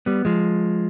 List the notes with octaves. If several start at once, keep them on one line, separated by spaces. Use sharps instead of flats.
G3 B3
F3 G#3